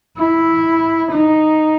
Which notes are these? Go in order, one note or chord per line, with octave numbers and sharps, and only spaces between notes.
E4
D#4